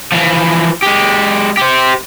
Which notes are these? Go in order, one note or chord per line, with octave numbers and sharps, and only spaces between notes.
E3 F3
G#3 G4
G4 C5